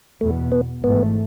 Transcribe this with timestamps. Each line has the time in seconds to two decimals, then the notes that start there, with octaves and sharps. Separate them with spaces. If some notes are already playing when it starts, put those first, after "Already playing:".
0.21 E2 B2 A3 B3
0.52 B3
0.84 G#1 G#2 E3 A3 B3